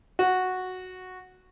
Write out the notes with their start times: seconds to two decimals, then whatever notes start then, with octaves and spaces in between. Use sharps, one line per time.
0.19 F#4